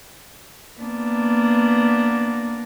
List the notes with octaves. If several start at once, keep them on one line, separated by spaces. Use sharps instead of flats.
A#3 B3 D4